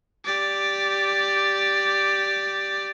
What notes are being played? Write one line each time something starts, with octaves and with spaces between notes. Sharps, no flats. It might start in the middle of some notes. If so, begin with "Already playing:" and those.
G4 D5